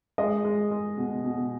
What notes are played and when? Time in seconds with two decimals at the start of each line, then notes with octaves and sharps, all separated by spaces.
0.18 G#3 D#5
0.45 G#3
0.71 G#3
0.98 B2
1.24 B2